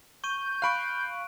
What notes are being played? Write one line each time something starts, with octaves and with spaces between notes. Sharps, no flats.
C#6 G6 D#7
F5 B5 C#6 F#6 D7